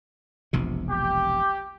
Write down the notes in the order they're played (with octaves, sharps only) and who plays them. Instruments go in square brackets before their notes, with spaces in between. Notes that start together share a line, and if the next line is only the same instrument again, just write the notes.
[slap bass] E1 A#1 C3
[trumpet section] G4